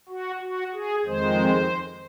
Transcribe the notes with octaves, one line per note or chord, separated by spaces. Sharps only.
F#4
F#4
G#4
F2 D#3 G#3 C5